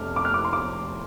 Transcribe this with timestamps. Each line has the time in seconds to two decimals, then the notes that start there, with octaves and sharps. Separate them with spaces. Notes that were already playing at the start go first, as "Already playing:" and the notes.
Already playing: F1 F2 A3 D6 F6
0.16 D6
0.25 F6
0.34 D6
0.44 C6
0.53 D6